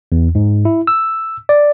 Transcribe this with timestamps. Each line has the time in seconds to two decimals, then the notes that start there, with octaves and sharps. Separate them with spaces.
0.12 E2
0.35 G#2
0.65 E4
0.87 E6
1.49 D5